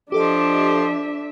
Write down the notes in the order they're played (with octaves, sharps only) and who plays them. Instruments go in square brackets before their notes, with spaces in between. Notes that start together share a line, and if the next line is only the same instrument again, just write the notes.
[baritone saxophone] F3 [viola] D4 E5 [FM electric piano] G4 A4 D#5 [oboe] D6